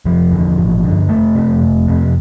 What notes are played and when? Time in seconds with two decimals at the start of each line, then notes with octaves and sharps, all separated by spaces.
0.05 F1 F3
0.32 E2 D3
0.57 A1
0.83 G2 D3
1.09 F1 A3
1.35 F2 C3
1.62 F1
1.87 F2 C3